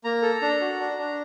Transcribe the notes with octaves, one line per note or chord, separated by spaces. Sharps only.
A#3 A#5
A4
D4
F#4
D4
D4